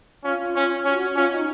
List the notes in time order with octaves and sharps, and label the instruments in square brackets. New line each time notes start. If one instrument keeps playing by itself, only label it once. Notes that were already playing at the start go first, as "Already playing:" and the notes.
[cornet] C#4 [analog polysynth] F4
[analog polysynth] F4
[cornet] C#4
[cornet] C#4 [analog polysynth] F#4
[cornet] C#4 [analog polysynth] F4
[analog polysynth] D#4